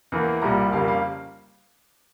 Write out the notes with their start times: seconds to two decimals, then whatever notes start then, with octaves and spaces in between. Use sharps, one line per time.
0.12 E2 E3 A#3
0.42 C2 A#2 G3 A#5
0.72 F2 C#3 G3 A#3 F5
0.88 F5